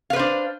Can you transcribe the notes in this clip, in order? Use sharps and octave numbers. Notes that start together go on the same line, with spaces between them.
D4 B4 C5 F5